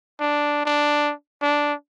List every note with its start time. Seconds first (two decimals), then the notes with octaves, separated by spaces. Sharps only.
0.20 D4
0.65 D4
1.42 D4